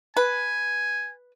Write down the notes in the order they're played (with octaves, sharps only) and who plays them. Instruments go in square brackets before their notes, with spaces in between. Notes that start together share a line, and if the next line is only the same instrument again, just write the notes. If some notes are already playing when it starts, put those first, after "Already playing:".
[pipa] B4 [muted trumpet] G#5